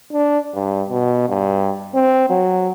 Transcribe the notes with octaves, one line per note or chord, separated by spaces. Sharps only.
D4
G2
B2
G2
C4
F#3